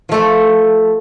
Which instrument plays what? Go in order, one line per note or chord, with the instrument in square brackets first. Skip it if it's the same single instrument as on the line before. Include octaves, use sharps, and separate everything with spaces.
[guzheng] F3 A3 A4